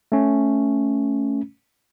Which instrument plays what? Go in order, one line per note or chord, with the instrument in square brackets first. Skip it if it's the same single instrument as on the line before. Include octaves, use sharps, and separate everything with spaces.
[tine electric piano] A3 C#4